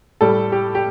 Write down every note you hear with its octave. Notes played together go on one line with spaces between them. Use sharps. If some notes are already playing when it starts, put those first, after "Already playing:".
A2 G3 A4
G4
G4